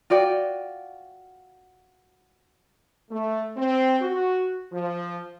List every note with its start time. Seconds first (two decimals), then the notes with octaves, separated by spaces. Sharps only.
0.10 F4 F#4 D5 G5
3.10 A3
3.57 C4
4.00 F#4
4.72 F3